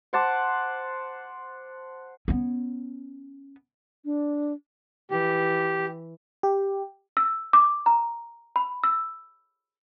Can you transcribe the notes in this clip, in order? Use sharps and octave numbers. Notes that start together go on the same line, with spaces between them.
C5 F#5 A5 D6
B3 C#4
D4
E3 G4
G4
E6
D6
A#5
B5
E6